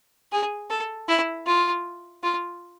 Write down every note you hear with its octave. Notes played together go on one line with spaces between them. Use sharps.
G#4
A4
E4
F4
F4